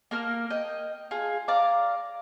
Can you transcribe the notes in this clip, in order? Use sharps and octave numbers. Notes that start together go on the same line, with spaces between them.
A#3 A#4 F6
D#5 G5
F4 G#4
D5 F5 A#5 D6